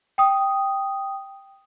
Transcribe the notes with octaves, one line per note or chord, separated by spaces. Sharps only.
G5 D#6